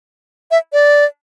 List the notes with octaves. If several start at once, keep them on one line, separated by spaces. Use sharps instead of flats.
E5
D5